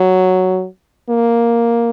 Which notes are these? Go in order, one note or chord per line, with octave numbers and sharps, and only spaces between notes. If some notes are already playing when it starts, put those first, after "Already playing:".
Already playing: F#3
A#3